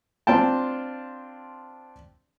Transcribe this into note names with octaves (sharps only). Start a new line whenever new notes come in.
C4 D4 F4 G5 A5